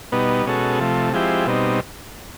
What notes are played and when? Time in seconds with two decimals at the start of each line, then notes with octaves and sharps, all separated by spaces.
0.12 B2 G3 B3 D#4
0.46 B2 G#3 C#4 F#4 A4
0.80 C3 F3 A3
1.13 F3 G#3 C4 E4 G4
1.47 B2 G3 C4 D#4